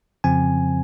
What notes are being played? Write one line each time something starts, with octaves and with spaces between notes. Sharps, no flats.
F2 C#3 F3 C4 G#5